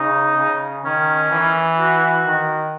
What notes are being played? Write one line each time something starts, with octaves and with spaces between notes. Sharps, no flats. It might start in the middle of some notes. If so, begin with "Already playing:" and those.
Already playing: C#3 D#4
C#3
D#3 C#4
E3
F#4
D#3